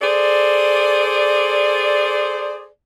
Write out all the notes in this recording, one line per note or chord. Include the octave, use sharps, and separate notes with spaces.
G#4 A4 C5 D5